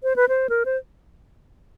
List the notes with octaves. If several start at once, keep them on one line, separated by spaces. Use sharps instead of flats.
C5
B4
C5
A#4
C5